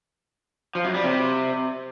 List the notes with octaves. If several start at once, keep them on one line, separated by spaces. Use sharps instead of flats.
F3
F#2
G3
C3